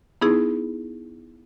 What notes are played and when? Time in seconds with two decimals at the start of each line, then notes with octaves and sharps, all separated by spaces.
0.21 B3 D#4 E4 G#4